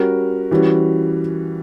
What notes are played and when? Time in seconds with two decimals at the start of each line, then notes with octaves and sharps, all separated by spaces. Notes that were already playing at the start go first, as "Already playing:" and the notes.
Already playing: G3 C#4 F#4 A#4
0.51 E3 G3 C#4 F#4